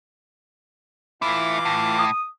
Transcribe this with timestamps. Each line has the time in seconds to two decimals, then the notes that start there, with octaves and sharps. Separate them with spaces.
1.22 E3 A3 E4 F4 D6
1.65 A2
1.99 D#6